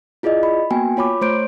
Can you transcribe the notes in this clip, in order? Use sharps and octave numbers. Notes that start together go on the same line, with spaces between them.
E4 F4 G#4 D5 D#5
B5
A#3 B3 F#4 G5 G#5
F4 C#5 B5 D6
A3 C5 C#5 C6 G6 D7